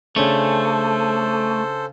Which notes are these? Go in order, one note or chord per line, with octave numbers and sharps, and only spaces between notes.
C#3 A3 C#4 D4 A4 C5